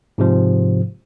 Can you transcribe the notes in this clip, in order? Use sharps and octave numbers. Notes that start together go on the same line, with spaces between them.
G#2 C3 F3